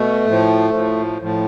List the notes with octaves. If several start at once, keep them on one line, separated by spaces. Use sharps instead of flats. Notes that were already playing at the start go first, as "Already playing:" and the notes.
Already playing: B2 A3
A2 F3
A2 F3
A2 F3